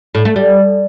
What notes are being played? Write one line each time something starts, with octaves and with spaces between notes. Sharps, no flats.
A2
A3
G3